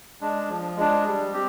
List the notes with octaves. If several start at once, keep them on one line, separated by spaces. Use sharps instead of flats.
G#3 D4
F3
G#3 D4
G3
C4 G4